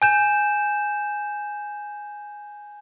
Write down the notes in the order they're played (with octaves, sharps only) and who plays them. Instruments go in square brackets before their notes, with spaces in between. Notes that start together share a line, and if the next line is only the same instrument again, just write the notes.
[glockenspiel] G#5 G6 E7